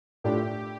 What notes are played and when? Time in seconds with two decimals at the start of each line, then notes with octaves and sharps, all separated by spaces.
0.24 A2 A3 D4 F4 G4